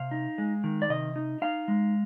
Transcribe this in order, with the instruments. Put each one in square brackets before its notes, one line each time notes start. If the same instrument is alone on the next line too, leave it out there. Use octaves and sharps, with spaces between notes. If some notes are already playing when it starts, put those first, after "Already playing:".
Already playing: [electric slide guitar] C3 F5
D#4
G#3
D#3
D5
C3 D#5
D#4
D#4 F5
G#3